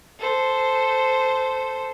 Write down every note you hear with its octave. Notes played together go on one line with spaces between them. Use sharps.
A4 C5